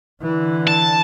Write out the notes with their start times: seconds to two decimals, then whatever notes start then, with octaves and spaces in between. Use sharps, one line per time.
0.22 D3 E3
0.67 A5